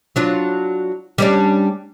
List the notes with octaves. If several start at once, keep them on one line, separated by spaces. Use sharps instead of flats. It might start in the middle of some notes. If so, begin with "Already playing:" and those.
F#3 D4 F4
G3 C#4 D4